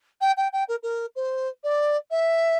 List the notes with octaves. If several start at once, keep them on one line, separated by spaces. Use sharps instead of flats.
G5
G5
G5
A#4
A#4
C5
D5
E5